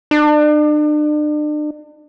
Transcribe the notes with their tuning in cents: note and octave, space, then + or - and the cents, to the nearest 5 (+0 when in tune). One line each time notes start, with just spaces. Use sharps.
D4 +40